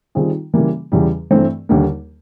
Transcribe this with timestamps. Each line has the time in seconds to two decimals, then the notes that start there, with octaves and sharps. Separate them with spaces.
0.15 D#3 G3 C4 F4 G#4
0.54 C#3 E3 G3 A#3
0.92 E2 C#3 E3 G3
1.31 G2 E3 A3 C4
1.69 D#2 D3 G3 A#3